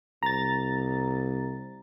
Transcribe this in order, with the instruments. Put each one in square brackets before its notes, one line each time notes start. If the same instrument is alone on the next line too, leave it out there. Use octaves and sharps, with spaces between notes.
[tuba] C2 [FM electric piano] A#5 A6